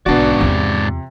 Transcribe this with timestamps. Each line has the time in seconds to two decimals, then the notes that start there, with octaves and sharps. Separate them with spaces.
0.06 B1 G#2 D3 B3 D4 F#4 D5
0.41 E2 C3 F4